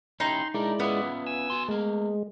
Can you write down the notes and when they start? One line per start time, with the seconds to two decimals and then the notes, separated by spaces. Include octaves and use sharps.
0.20 C#4 D#4 E4 G4 C6
0.54 G#3 D4 E4 A#4 D5
0.80 B3 C#4 F4 E5
1.26 G#5 E6
1.50 F#4 C6
1.68 G#3 A3 A#4